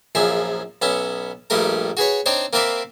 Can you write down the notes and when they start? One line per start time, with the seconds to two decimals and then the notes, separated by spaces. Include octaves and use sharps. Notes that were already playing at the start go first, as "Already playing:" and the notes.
0.15 A#1 F#2 F3 G#4 E5
0.82 B1 B3 C#4 E5
1.50 A#1 G2 G3 A3 A#4 A#5
1.97 F#4 G#4 B4 C#5
2.26 C4 D4 D#4 C5 C#5
2.53 A#3 C4 A#4 D5 E5 B5